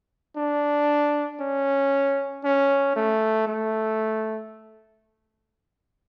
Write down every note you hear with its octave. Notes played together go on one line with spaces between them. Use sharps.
D4
C#4
C#4
A3
A3